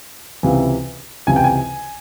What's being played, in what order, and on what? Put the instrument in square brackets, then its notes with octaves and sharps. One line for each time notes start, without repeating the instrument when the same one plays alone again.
[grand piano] C#2 C3 E3
C#2 C3 E3 G#5
G5
G#5